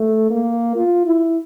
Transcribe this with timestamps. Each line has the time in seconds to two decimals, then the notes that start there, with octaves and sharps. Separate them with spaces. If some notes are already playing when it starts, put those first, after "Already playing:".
Already playing: A3
0.30 A#3
0.76 F4
1.06 E4